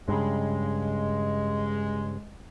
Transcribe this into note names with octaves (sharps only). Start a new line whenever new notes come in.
G2 C#3 G#3